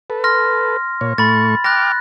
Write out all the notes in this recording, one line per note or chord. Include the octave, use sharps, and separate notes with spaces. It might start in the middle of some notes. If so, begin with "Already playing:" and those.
A4 B4
C6 F6 A#6
A#2 C#5
A2 A3 B5 C#6 A6
G5 D6 F6 F#6 A#6